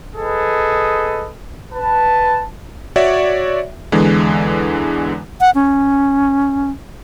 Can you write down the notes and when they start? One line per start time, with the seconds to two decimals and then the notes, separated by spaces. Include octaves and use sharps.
0.16 G#4 A4 B4 D#5
1.73 B4 A5
2.96 F#4 C#5 D5 E5
3.92 E2 D3 E3 G#3
5.41 F#5
5.55 C#4